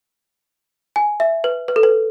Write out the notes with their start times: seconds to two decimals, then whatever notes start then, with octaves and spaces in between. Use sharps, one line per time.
0.96 G#5
1.20 E5
1.44 B4
1.68 B4
1.76 A4
1.83 B4